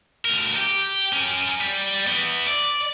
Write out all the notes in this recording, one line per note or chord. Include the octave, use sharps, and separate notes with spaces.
D2 A#4
G4
C#4 A#4
G3
E3 B3
D5